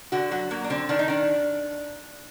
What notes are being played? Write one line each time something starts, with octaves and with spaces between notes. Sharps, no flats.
D3 F#4
F#3 F#4
F#3 A#3
D4
D3 C4
D#3 D4
D#4
D#3 D4